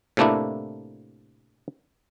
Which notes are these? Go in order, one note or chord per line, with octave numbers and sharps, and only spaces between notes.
A2 C3 A3 A#3 D4 E4